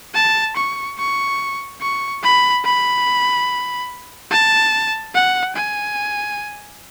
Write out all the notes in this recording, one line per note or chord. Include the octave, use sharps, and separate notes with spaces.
A5
C#6
C#6
C#6
B5
B5
A5
F#5
G#5